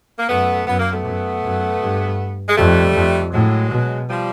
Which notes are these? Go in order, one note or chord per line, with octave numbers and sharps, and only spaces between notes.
A#3
F#2 A3 B3
F#2 B3
A#3
A3 B3
F#2
F#2
G2
G#3
F2 G3 A3
F2
A2 F#3 G#3
B2
F3 G3